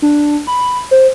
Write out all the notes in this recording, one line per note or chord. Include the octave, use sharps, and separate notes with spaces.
D4
B5
C5